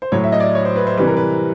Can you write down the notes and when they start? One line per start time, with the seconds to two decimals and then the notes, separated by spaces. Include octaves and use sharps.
0.02 C5
0.12 A2 F#3 C#5
0.24 E5
0.32 D#5
0.40 D5
0.55 C#5
0.65 C5
0.76 B4
0.87 C5
0.98 C3 E3 G3 B4
1.07 A#4
1.17 B4